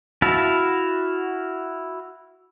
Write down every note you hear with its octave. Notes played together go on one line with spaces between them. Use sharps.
E4 F#4 E5 F5 A5